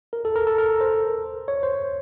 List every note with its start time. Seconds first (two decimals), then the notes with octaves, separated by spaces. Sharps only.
0.13 A#4
0.25 A4
0.35 A#4
0.47 A4
0.58 A#4
0.81 C5
1.48 C#5
1.63 C5